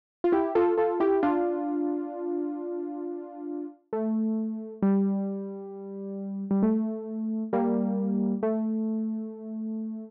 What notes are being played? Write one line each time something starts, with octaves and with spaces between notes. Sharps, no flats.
F4
E4 G4
F4 A4
F4 A4
E4 G4
D4 F4
A3
G3
G3
A3
G3 A#3
A3